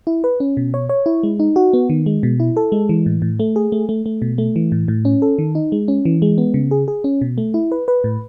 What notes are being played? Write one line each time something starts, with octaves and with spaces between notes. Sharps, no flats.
E4
B4
C#4
B2
C#5
C#5
E4
G#3
D#4
F#4
B3
D#3
G#3
B2
E4
A4
G#3
E3
A2
A2
A3
G#4
A3
A3
A3
B2
A3
E3
A2
A2
C#4
A4
D#3
D#4
G#3
C#4
E3
G#3
B3
C#3
G#4
G#4
C#4
B2
A3
E4
B4
B4
A2